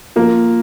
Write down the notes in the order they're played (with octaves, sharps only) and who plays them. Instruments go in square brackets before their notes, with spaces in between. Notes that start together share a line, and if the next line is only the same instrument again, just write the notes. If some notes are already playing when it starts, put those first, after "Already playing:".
[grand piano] F3 A#3